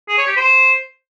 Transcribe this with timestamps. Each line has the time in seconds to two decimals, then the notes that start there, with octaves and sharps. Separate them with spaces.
0.09 G#4
0.18 C#5
0.27 G4
0.36 C5